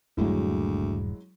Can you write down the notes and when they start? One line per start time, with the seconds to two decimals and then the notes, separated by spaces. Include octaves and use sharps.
0.17 D#1 D2 G2 F#3 G#3 A#3 E4